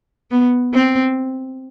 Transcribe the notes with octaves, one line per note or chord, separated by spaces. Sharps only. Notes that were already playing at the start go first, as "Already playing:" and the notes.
B3
C4